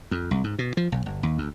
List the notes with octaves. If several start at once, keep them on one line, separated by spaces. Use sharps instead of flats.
F2
C2
G#2
B2
F3
B1
G1
D#2
D2